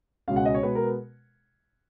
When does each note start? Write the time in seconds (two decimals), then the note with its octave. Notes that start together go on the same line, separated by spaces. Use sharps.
0.28 C#2 B2 G#3 C#4 F5
0.36 F#5
0.45 D#5
0.54 C#5
0.63 B2 G#3 B3 B4
0.75 A#4